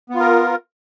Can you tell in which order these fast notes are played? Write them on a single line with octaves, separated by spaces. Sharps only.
B3 F4 A#4